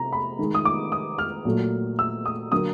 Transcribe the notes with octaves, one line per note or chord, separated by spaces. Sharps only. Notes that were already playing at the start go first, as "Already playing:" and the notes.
Already playing: C3 A3 A#5
B5
D#3 G#3
D#6
D6
D#6
F6
A#2 F#3 A3
E6
D#6
D3 F#3 A#3 D#6